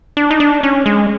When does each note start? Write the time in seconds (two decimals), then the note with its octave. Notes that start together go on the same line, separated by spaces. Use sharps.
0.17 D4
0.31 D#4
0.40 D4
0.63 C#4
0.86 G#3